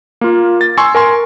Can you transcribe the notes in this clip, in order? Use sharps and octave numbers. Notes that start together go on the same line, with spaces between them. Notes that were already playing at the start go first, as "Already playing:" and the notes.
A#3 F4
A6
G#5 C6 C#6 E6
A#4 G#5 C6